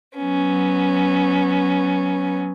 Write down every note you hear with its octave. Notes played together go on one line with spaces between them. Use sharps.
F#3 B3 C#4